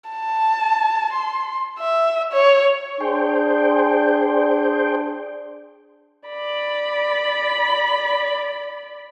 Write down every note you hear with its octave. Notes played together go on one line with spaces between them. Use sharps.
A5
C6
E5
C#5
D4 G#4 C5 G5
D5 B5